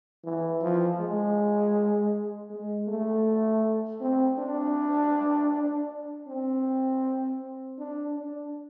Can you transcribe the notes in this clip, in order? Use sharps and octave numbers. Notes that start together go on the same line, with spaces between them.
E3
F3
G#3
G#3
A3
C4
D4
C4
D4
D4